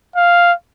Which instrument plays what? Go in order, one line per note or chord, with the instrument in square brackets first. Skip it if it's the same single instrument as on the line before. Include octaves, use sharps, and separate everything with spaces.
[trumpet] F5